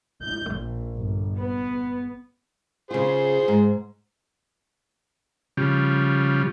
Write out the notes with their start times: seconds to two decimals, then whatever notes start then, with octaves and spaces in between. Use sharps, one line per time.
0.23 G6
0.52 A#1
0.95 G1
1.39 B3
2.91 C#3 F4 G#4 C5
3.48 G#2
5.57 C#3 F3 G3